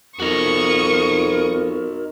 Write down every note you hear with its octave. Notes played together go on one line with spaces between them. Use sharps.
F2 D#4 F#4 A#4 C#6 D#6